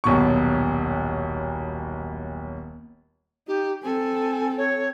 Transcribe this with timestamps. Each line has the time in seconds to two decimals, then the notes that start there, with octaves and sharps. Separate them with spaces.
0.04 D#1 B1 B2 C#6
3.47 D#4 G4
3.83 C4 A4 G#5
4.57 C#5